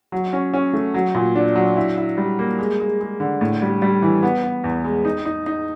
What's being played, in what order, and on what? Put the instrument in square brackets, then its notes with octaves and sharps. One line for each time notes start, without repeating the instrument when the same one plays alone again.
[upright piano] F#3
C#4
C#4
A3
F#3
A#2
D4
F#3
E4
E4
G3
A#3
G#3
G#3
G#3
D3
A2
G3
G3
E3
B3
B3
E2
G#3
D#4
D#4
D#4